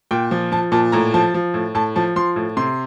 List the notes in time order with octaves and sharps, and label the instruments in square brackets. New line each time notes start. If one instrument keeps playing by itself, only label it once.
[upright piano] A#2 G5
F3
F3 A5
A#2 A5
A2 A#5
F3 A5
F3
A2
A2 A5
F3 A5
F3 C6
A2
C3 C6